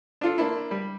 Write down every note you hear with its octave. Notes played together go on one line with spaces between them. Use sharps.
D4 F4 A4
A#3 D4 E4
G3